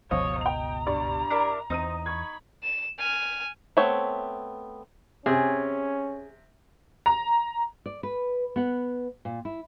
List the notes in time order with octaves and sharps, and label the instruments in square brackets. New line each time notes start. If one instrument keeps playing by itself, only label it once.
[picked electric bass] F#1 C#2 B2 [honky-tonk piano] F3 [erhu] C#5 [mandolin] D#5
[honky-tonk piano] G5 F7 [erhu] A#5
[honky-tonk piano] G2 D5 C#6
[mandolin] D4 E4 A#4
[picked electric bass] E2 [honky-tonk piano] C4 D#6 D#7 [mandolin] D#4
[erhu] B5 [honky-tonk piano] C#6 G#6
[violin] E7
G#5 F6
[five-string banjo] A3 B3 C4 C#5
[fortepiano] C3 [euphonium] C#4 [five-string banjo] G#4
[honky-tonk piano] A#5
[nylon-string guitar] D5
B4
B3 F#5
A#2
E4